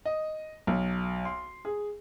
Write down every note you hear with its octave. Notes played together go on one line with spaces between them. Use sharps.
D#5
B1
C6
G#4